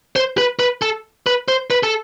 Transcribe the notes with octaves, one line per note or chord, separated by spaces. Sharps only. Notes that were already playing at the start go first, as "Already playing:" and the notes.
C5
B4
B4
A4
B4
C5
B4
A4